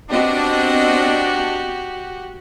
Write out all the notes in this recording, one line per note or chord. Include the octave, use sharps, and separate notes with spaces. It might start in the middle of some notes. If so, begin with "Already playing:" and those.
B3 C4 D4 F#4 G4 D#5